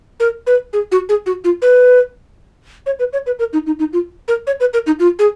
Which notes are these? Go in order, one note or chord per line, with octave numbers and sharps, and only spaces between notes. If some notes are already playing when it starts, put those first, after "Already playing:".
A#4
B4
G#4
F#4
G#4
F#4
F4
B4
C#5
B4
C#5
B4
A#4
D#4
D#4
D#4
F4
A#4
C#5
B4
A#4
D#4
F4
G#4